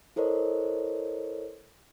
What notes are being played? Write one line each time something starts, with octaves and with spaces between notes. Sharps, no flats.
E4 A4 A#4 C5 C#5 D#5